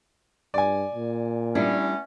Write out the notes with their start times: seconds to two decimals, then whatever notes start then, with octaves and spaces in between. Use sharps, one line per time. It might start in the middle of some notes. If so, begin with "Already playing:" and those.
0.54 G2 D5 G#5
0.94 A#2
1.55 E2 G3 A3 C#4 D4 E4